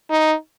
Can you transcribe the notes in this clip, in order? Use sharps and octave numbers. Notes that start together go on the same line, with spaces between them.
D#4